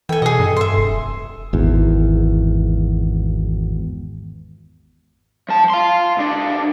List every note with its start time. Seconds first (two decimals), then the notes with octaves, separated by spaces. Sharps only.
0.09 E3 A4 G5 G#5
0.22 B2 G#4 D#5
0.39 G2
0.57 E5 C6
0.77 F1
1.53 G#1 E2
5.49 F3 A5
5.70 F5 C6
6.17 C#2 D4